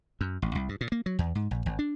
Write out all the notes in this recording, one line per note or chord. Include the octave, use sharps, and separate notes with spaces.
F#2
A1
C2
G2
A#2
A#3
F#3
E2
G#2
A#1
G#1
D4